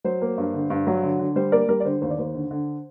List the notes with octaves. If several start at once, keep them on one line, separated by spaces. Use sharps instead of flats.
F#3 C5
A#3
G2
D3
G2
F#3
D3
D3
G3 C5
A#3 A#4 D5
G3 A#4
D5
D3 C5
D#2 C5
D5
D#2 C5
D3
D3